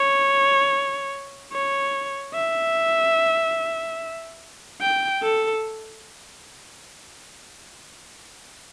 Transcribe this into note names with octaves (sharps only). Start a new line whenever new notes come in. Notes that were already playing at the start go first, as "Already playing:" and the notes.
Already playing: C#5
C#5
E5
G5
A4